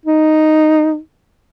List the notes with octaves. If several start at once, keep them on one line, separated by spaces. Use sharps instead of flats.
D#4